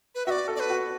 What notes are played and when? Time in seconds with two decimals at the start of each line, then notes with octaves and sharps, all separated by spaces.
0.15 B4
0.26 F#4 E5
0.31 D5
0.48 A4
0.56 D5
0.60 B4
0.70 F#4